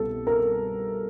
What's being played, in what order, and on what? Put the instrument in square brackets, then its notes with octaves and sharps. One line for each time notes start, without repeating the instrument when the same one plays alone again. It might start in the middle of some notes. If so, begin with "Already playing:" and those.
Already playing: [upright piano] C2 B2 A4
A#4